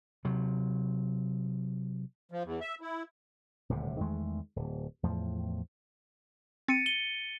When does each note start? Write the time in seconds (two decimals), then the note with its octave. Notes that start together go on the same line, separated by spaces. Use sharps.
0.25 C3 F#3
2.32 F3
2.44 E2
2.61 E5
2.81 E4
3.69 D#1 D2 A2 C3
4.00 E2 D#3 G#3 A3
4.56 D1
5.03 E2 A2 F3
6.68 C4 A6 C#7 D#7
6.86 D#7 G7